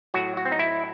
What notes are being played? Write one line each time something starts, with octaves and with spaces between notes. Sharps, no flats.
A2 F#3 F#4
F#4
C4
D#4
E4